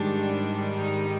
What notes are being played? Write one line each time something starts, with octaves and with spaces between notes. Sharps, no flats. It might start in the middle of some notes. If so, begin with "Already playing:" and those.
Already playing: G#2 D#3 G3 D4
D#4